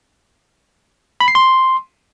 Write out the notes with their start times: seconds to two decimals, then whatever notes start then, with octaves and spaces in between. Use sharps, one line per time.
1.20 B5
1.28 C7
1.35 C6